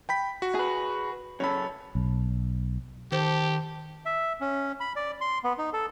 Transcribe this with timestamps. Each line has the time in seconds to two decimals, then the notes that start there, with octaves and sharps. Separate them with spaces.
0.09 G5 B5 B6
0.42 F#4
0.55 G#4 B4
1.40 F#2 C#3 A4 C#5 B5
1.95 B1
3.12 D#3 G4 A4 C5
4.05 E5
4.41 C#4
4.80 B5
4.96 D5
5.21 C6
5.44 B3
5.58 D#4
5.73 A4